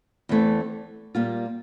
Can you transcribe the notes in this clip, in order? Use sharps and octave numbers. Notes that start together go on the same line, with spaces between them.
E2 E3 A3 C4
A#2 G3 A#3 F4